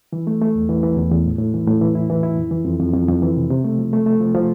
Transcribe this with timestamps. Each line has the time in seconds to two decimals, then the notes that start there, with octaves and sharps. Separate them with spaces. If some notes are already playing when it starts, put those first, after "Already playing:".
0.13 E3
0.27 A3
0.41 A3
0.55 E2
0.69 E3
0.83 E3
0.97 E2
1.11 E2
1.26 A2
1.39 A2
1.54 E3
1.67 A2
1.81 E3
1.95 E4
2.10 E3
2.23 E4
2.37 F2
2.51 E3
2.65 F2
2.80 F2
2.93 F2
3.08 F2
3.22 E3
3.36 C3
3.50 C3
3.64 A3
3.78 F3
3.93 A3
4.06 A3
4.20 F3
4.34 F3